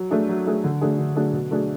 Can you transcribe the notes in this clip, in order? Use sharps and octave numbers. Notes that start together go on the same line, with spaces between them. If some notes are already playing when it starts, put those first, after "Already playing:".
Already playing: F#3
A3 D4 G#4
F#3
A3 D4 G#4
D3
F#3 A3 D4 G#4
D3
F#3 A3 D4 G#4
B2
F#3 A3 D4 G#4